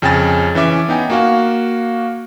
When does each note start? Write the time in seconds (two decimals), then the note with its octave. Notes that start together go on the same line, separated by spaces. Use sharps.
0.02 F2 C#3 G5 G#5 A6
0.55 E3 C#4 E5 D6
0.89 B3 D#4 G5 G#5
1.10 A#3 F#4 F5